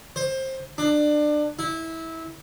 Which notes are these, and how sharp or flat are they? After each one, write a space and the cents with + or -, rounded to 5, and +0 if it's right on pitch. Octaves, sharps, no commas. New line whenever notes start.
C5 +20
D4 +25
E4 -20